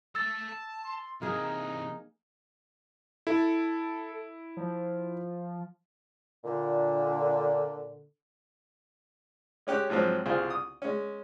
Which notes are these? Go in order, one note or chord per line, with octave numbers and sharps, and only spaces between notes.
A4 E5 E6 A6
A5
C6
C3 E3 A#3 D#4 G#4
E4 A4
F3
A#2 D3
G#3 C#4 G4 F#6
G#2 F3 F#3 C4
C2 F4 G#4 C5
D#6
G#3 C#4